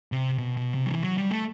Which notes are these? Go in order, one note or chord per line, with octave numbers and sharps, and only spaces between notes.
C3
B2
B2
C3
F#3
E3
F#3
G3
A3